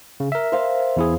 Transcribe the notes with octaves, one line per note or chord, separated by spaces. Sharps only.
C#3
A#4 E5
C5 F5
E2 E4 G#4